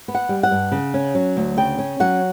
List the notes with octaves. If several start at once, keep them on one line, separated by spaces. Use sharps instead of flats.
B3
F#5
G3
F#5
G2
C#3
C#4
F#3
D2
C#3 G5
C#4
F#3 F#5